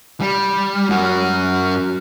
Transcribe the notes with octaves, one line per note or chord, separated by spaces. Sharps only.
G3
F#2 F#4